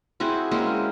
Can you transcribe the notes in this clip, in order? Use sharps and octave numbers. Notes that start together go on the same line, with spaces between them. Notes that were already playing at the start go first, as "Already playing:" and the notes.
C4 E4 F#4 G#4
G#3 A#3 C4 C#4